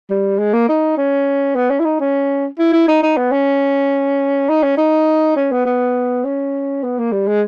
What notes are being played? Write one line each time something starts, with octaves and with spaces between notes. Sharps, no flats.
G3
G#3
A#3
D#4
C#4
B3
C#4
E4
D#4
C#4
E4
E4
D#4
D#4
B3
C#4
D#4
C#4
D#4
C#4
B3
B3
C#4
B3
A#3
G3
G#3